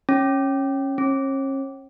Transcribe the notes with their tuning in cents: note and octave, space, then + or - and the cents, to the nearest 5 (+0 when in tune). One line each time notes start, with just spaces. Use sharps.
C#4 -15
C#4 -40